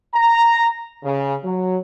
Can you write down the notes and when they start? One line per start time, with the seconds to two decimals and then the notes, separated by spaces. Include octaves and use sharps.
0.13 A#5
1.03 C#3
1.44 F#3